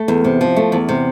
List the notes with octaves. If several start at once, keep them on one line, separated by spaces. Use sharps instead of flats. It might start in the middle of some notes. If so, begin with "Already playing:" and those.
Already playing: A3
E2
C3
F3
A3
E2
C3